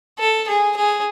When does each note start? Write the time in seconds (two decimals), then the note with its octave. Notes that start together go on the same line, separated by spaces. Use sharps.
0.19 A4
0.48 G#4
0.76 G#4